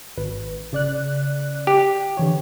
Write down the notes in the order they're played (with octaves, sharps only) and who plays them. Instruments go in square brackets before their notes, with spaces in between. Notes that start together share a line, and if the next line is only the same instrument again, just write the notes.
[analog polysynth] G#1 B4
C#3 D5 F#6
[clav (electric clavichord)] G4
[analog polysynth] D3 E3 C#5